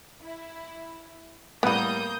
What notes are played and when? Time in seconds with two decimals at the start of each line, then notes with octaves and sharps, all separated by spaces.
0.22 E4
1.63 A2 G3 A#3 B3 F#5 D#6 G6